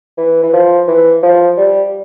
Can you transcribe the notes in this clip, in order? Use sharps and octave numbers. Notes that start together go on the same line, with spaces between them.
E3
E3
F3
E3
F3
G3